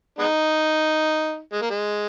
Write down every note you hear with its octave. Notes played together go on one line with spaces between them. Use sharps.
G#3 B3 D#4
G#3
A#3
G#3